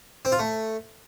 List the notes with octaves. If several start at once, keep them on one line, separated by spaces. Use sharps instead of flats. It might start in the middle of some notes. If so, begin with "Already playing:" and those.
C4
F4
A3